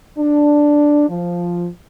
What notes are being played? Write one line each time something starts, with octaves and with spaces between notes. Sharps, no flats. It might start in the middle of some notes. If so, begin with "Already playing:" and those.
D4
F3